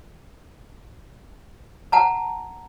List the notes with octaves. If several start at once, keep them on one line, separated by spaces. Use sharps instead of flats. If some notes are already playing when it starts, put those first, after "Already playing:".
F#5 A5 A#5